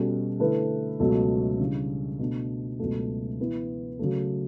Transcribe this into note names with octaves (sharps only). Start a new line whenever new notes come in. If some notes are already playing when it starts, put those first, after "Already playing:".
Already playing: B2 G3 C#4 F#4 A4
D3 A3 E4 B4
C#2 B2 F#3 A3
C#3 E3 G3 D4
B2 A3 D4
C#2 B2 F#3 A3
E3 B3 E4
C#3 F#3 A3